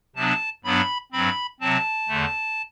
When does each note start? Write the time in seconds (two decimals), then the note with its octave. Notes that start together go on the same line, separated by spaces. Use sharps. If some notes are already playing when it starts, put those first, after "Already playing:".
0.16 C3 F#3 B3 D4 A5
0.64 G2 F#3 B3 D4 B5
1.12 G2 F#3 C4 B5
1.60 C3 F#3 C4 A5
2.08 E2 D3 A3